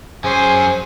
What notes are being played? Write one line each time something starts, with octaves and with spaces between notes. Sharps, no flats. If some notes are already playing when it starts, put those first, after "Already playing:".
F#2 C#4 G#4 C5 G#5